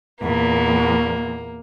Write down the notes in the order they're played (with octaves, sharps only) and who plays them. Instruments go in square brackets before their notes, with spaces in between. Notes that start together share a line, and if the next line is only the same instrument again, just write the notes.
[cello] E2 A#2 [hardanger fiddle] A#3